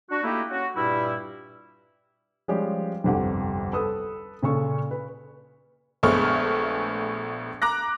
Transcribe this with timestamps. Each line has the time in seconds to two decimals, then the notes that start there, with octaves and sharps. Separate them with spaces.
0.10 D4 F#4
0.24 A3 A#3 D#4 E4 G4
0.50 C#4 F#4
0.76 G2 A#2 G3 E4
2.48 F3 G3 G#3 C#4 G4
3.04 G1 C2 F2 G4 F#5
3.73 A4 B4 D#6
4.42 A#2 C#3 A4 C#6
4.91 B4
6.03 A#1 G#3 A3 B3 C#6 F6
7.62 A#5 D6 F#6 A#6